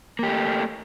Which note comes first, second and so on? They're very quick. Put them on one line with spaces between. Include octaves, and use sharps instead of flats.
A#3 G4 A3